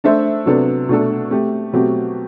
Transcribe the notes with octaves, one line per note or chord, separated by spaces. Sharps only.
A3 D4 A4 C5 E5
C3 F#3 B3 D4 A4
B2 A3 D4 A4
A3 C4 G4
B2 F#3 A3 C4 G4